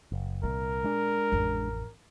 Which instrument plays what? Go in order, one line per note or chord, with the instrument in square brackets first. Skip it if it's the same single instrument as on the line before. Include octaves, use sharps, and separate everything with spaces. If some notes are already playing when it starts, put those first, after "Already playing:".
[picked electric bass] F#1
[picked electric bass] C2 [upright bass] A#2 [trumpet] A#4
[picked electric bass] G#3 D4
[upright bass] A1 F2